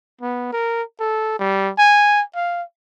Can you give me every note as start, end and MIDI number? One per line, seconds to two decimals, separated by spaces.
0.22 0.50 59
0.52 0.83 70
1.00 1.38 69
1.39 1.70 55
1.78 2.22 80
2.36 2.62 77